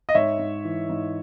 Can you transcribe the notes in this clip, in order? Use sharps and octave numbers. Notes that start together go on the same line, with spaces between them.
D#5
G#2 C#5 E5
G#2
E3
G#2